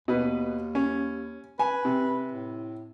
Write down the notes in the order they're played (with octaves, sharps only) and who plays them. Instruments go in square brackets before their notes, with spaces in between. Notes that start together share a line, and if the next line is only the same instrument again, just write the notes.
[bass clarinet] D#2 [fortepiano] B2 B4
[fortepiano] C#4
[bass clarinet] B4 [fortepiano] G#5
[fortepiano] C3
[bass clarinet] A2